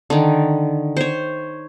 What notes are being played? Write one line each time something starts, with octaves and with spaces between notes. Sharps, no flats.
D3 D#3
C5 C#5